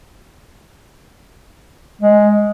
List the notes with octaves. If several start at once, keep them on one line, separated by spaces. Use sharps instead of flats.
G#3